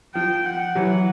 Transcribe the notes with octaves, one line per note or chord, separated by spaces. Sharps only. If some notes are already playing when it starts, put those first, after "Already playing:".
F3 G5
F#5
E3 F#3